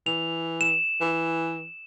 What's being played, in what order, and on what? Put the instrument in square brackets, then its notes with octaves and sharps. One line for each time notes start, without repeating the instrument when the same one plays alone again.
[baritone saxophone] E3 [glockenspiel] F7
[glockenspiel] E7
[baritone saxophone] E3